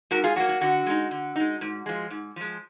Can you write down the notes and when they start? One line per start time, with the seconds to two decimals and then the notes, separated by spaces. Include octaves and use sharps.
0.11 G#2 F#4 A#4
0.24 F4 G#4
0.36 F#3 F#4
0.40 A#3
0.49 F#4
0.61 D3 F#4
0.86 G#3 D#4
1.11 D3
1.36 G#3 D#4
1.61 G#2
1.86 F3 G#3
2.10 G#2
2.36 F3 G#3